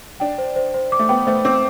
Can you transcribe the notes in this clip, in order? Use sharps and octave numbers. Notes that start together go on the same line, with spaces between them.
D4 G5
C5
C5
C5
D6
A3
B3 G5
A3 C5
C4 D6